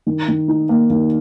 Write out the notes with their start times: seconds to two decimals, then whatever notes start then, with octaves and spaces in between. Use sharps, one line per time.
0.06 D#3
0.28 D#3
0.48 D#4
0.69 A#3
0.90 D#3